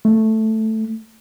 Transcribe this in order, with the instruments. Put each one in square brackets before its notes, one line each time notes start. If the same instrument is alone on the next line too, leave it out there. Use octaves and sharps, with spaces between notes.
[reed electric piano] A3